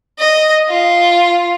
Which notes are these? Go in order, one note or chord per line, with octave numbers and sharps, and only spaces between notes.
D#5
F4